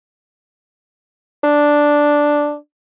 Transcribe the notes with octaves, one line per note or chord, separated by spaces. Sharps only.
D4